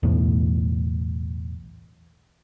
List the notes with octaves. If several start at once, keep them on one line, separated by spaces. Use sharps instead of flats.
B1 E2 A2